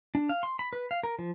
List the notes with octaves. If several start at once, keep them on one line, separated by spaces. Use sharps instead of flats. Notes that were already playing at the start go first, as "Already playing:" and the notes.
D4
F5
C6
B5
B4
F5
A#4
F3